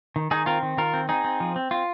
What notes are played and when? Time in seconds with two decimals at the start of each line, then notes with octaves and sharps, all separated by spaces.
0.16 D#3
0.31 D#3 D#4 G#4
0.46 C4 F4 A#4
0.63 D#3
0.77 D#3 F4 A#4
0.94 C4
1.09 C4 D#4 G#4
1.25 C4
1.40 F3
1.56 C4
1.71 C4 F4